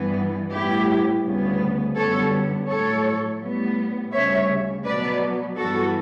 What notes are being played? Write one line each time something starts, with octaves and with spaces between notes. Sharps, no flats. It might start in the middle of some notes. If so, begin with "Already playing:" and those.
Already playing: G2 E3 G3 B3
A2 G3 B3 E4 G4
D2 C#3 G3 B3
F#2 D3 G3 B3 A4 C#5
A2 F#3 A3 A4 C#5
A2 G3 B3
D2 C#3 G3 C#5 E5
B2 F#3 B3 B4 D5
G2 E3 B3 F#4 A4